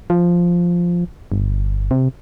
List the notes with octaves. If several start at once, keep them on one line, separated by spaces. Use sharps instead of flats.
F3
G1
C3